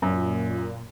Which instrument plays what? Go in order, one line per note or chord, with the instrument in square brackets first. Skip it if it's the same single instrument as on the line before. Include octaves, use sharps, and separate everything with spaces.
[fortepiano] F#2 [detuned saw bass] A#2